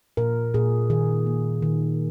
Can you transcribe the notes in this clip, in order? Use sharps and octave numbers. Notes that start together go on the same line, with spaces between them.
A#2 A#4
A#2 G#4
D#3 G#4
A#3
D#3